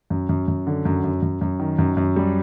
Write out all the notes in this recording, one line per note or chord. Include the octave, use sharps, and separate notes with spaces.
F#2
F#2
F#2
D3
F#2
F#2
F#2
F#2
D#3
F#2
F#2
G3